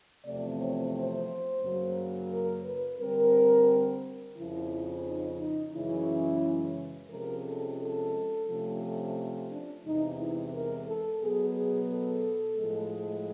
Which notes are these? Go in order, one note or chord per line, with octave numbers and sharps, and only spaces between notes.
E2 C3 F3 A3 C4 D5
C#5
C5
F#2 C#3 F#3 A#3
A#4
B4
D3 G3 C4 A#4
F2 C#3 F3 E4
D#4
D#4
F#2 C#3 E3 G#3 C#4 E4
C3 F3 G#3 C#4 A#4
A4
A4
C3 F3 A3 C#4
D4
E2 C3 E3 G#3 D#4
E4
A#4
A4
B2 F#3 B3 G#4
G#4
A4
A2 F3 G#3